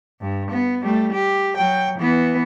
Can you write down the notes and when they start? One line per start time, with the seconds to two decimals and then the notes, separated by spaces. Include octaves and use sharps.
0.21 G2
0.51 B3
0.83 G3 A3
1.12 G4
1.56 F#3 G5
1.98 E3 B3